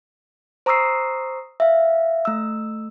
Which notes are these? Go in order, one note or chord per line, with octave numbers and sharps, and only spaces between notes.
C5 A#5 C#6 D#6 E6 C7
E5 F5
A3 E6